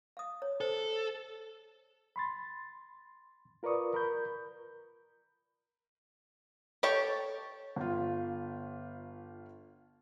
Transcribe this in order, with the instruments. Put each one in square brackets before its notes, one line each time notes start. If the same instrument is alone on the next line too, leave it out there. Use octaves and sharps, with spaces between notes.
[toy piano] F5 D#6
C#5
[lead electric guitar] A4 [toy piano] C5
[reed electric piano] B5 C6 A6
F4 A#4 B4 D5 C#6 D#6
A#4 B5 G6
[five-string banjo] G4 A4 C#5 G5 A5
[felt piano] G1 F4